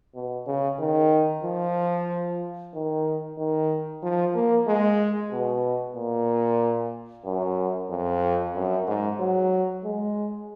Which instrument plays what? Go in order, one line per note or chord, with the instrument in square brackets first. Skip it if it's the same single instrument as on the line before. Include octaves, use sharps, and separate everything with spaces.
[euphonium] B2
C#3
D#3
F3
D#3
D#3
F3
A#3
G#3
B2
A#2
F#2
F2
F#2
G#2
F#3
G#3